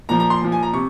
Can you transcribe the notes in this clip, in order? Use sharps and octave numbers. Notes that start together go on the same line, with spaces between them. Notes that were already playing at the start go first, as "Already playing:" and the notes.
A#2 F3 A#5
A#5
C6
A#2 F3
G#5
A#5
C3 C#6